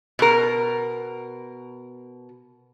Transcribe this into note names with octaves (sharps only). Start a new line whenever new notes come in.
B2 A#4